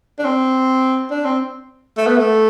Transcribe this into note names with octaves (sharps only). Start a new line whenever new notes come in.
D4
C4
D4
C4
A3
B3
A3